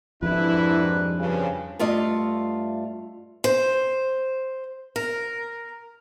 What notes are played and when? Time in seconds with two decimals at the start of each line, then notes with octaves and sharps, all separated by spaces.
0.23 F2 G#2 G3 D4 E4 B4
1.20 G2 C#3 F3
1.79 G2 A3 F4 D5 D#5
3.44 C5
4.96 A#4